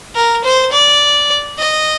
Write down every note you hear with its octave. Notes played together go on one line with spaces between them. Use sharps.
A#4
C5
D5
D#5